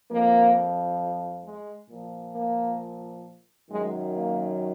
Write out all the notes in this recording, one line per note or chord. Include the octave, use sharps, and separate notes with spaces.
F2 F3 A#3
G#3
A#2 F3
A#3
F#2 D#3 F#3 G#3
A#3